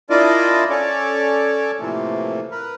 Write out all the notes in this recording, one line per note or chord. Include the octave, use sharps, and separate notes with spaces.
D4 E4 F4 A#4 D5 D#5
C#4 A4 C#5 D5
A2 C3 E3 F3 A3 A#3
A#4 B4